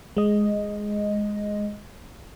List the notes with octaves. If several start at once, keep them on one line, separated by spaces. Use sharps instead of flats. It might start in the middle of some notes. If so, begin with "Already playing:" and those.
G#3 D#5